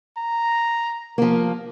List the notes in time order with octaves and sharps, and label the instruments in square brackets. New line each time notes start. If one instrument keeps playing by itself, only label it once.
[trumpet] A#5
[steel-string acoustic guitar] F3 A#3 [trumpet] A#4